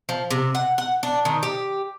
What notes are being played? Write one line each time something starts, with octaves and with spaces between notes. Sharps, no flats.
F3
C3
F#5
F#5
D4
D#3
G4